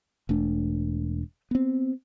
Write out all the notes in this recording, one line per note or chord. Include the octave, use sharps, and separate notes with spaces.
E1 A3 D4
B3 C4